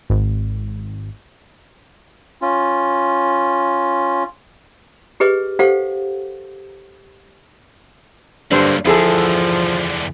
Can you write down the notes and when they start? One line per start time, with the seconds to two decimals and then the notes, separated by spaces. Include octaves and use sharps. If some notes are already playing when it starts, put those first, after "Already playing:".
0.10 G#1
2.42 C#4 F4
5.20 G4 G#4 B4 D#5
5.59 G4 A4 C5 F5 F#5
8.51 G2 D3 F#3 A#3 C5
8.85 E2 D3 F3 E4 G#4 A4